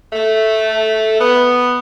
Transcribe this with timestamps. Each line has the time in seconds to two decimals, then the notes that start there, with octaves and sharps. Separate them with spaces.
0.13 A3
1.21 B3